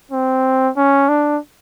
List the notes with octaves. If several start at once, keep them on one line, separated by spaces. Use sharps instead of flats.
C4
C#4
D4